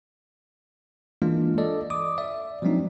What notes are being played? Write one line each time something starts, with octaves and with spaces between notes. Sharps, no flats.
E3 G#3 A#3 D4 F4
A4 D5 D#5
D6 D#6
D5 E5
F3 F#3 G#3 C4 D4 D#4